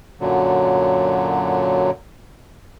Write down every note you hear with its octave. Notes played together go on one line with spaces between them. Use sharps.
F#2 A#2 D3 F#3